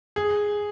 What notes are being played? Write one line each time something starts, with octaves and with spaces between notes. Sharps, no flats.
G#4